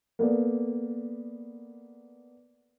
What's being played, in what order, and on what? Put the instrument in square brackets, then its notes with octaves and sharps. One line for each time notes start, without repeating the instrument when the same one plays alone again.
[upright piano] A#3 B3 A4 D5